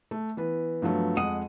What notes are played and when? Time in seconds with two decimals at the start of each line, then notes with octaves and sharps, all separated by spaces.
0.11 A3
0.37 E3 B3 B4
0.82 G2 F3 F#3 A3 B3
1.17 F2 G#3 F#5 D#6 D#7